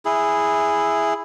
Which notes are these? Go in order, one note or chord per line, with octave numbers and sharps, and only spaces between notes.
E4 G#4